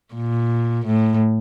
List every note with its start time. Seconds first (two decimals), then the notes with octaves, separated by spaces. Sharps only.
0.14 A#2
0.85 A2